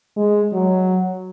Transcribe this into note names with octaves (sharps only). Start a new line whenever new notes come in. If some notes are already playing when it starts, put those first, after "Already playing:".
G#3
F#3